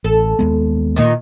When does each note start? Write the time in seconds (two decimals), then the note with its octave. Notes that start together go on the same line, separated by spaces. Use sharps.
0.04 A1 A4
0.39 D#2 G#3 B3
0.96 A#2 D#3 D#4